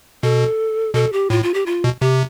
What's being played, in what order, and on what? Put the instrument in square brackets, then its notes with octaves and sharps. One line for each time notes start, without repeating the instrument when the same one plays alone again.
[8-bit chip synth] B2 [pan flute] A4
[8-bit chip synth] B2 [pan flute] A4
[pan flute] G4
[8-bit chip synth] A2 [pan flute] F4
[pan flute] F4
G4
F4
[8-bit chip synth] B2
[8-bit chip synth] C3 [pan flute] G4